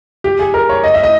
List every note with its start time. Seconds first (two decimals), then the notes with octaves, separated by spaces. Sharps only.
0.24 G4
0.39 G#4
0.54 A#4
0.69 C#5
0.84 D#5
0.94 E5
1.03 D#5